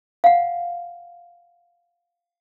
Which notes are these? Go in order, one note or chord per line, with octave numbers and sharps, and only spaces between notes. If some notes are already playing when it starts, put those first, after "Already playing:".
F5 F#5